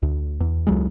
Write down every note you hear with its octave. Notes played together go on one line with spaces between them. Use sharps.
D2
E2
C#2 F#3 G#3